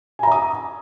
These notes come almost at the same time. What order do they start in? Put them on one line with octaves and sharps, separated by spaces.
G#5 A#5 E5 D#6